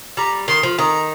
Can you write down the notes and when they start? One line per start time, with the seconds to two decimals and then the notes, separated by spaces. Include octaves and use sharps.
0.17 G3 A#5
0.48 D#3 C6
0.63 F3
0.78 D#3 A#5